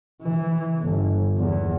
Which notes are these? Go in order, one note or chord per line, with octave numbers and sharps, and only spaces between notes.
E3
G1
E2